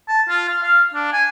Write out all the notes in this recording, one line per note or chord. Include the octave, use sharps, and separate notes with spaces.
A5
F4
F5
F5
D4
G#5